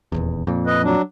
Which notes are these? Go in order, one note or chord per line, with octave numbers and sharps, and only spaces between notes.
D#1 G#1 E2
F2 A#2
B4 D#5
F#3 D4